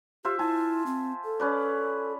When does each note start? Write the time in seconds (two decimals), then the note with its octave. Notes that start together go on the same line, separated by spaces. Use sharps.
0.25 F4 G4 C5 E5
0.39 E4 G#5 A5
0.86 C4
1.25 A4
1.40 C#4 B4 D5